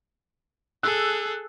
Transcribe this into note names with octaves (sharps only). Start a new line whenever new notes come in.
G#4 A4 E6 F#6